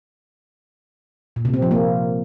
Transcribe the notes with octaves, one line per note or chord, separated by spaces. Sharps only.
A#2
C3
C4
F3
A#3